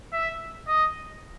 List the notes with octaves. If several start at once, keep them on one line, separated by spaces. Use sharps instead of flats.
E5
D#5